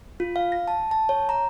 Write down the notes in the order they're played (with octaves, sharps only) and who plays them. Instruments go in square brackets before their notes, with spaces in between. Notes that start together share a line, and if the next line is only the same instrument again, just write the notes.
[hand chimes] F4
F5
A#6
A5
A5
C#5
A#5